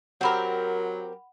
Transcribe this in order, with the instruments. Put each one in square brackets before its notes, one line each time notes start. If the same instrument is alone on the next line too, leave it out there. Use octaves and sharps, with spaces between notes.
[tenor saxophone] F#3 [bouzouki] C4 G4 A#4 [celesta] F#5 B5